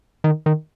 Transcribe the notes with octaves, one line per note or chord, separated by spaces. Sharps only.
D#3
D#3